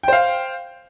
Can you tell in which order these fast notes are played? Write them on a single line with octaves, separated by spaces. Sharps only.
G5 C5 F5